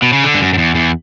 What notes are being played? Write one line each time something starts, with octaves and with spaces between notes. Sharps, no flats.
B2
C#3
D3
G2
F#2
F#2
E2
E2